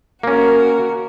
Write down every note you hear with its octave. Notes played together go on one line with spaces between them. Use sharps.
A#3 C#4 F#4 A#4